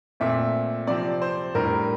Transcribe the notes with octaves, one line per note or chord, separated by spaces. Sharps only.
A#2 A3 C4 E5
C3 F3 C4 D5
C5
A2 G3 D4 A#4